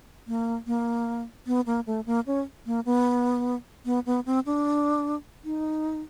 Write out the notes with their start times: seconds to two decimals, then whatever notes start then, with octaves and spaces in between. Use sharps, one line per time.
0.28 A#3
0.67 A#3
1.47 B3
1.66 A#3
1.87 A3
2.06 A#3
2.27 C#4
2.66 A#3
2.86 B3
3.86 B3
4.06 B3
4.26 C4
4.46 D4
5.44 D#4